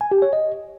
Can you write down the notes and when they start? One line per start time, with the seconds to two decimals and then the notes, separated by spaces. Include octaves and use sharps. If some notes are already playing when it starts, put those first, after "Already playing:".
0.01 G#5
0.11 G4
0.22 C#5
0.33 D#5